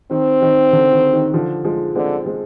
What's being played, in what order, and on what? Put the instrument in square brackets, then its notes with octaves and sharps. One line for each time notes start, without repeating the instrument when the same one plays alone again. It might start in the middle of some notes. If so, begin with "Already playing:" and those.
[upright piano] D#3 [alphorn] C4
[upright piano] D#3
D3
D#3
D#3
D3 F3
F3 G#3
[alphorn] D3 [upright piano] G#3 C4
[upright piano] G#3 C4